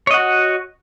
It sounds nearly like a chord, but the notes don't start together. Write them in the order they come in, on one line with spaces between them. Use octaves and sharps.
C#5 D#5 F#5 F#4